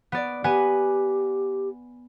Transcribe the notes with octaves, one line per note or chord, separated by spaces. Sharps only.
B3 D5
B3 G4 B4 G#5